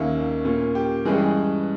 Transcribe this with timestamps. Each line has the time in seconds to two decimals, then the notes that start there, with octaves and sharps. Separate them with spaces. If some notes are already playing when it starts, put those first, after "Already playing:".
Already playing: D#2 D#3 A#3 C#4 E5
0.45 A#2 A#3 C#4
0.75 G4
1.05 G2 E3 G#3 C#4 G#4